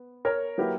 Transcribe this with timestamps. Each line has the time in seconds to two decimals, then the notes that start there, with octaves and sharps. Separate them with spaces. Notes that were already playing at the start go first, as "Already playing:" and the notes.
Already playing: B3
0.25 A#4 C#5
0.58 F#3 A#3 E4 G4 B4